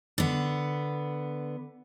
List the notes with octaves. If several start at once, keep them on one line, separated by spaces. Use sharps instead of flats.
D3 B3